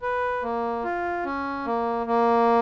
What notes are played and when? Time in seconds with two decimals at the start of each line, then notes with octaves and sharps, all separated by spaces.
0.02 B4
0.43 A#3
0.84 F4
1.25 C#4
1.66 A#3
2.06 A#3